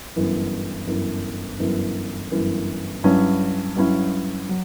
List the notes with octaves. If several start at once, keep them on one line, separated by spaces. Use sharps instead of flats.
G1 F#2 E3
G1 F#2 E3
G1 F#2 E3
G1 F#2 E3
G2 F#3 C#4 E4
G2 F#3 C#4 E4
F#3